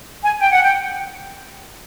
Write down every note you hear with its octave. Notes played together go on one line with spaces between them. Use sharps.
G#5
G5
F#5
G5